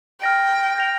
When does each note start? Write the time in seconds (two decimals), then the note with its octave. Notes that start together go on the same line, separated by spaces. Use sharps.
0.21 G5 F6 A#6 D7
0.76 G6 A#6 F7